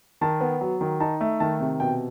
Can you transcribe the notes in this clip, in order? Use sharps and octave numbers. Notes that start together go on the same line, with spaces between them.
D#3 A5
B3
F#3
D#3
D#4 A5
A3
D#3 A5
C3
B2 G5